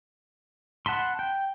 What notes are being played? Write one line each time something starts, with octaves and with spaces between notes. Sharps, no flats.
F#5 A5 B5 C6
G5